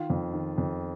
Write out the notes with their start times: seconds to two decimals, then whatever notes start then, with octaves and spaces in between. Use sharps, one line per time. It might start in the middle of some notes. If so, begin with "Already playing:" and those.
Already playing: D#3 F4
0.10 F2
0.34 D#3
0.58 F2